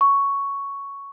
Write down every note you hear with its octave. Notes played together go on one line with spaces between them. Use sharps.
C#6